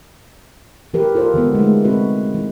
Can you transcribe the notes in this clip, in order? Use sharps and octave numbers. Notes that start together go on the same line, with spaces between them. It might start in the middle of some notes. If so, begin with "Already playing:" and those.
E3 G4 A#4 B4
F4 A4 A#4 C5
D3 D#3 G#3 B3
G#3 A3
C4 F#4 B4
E3